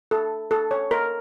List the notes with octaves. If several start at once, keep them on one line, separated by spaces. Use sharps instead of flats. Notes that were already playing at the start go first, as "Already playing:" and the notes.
A4
A4
C#5
A#4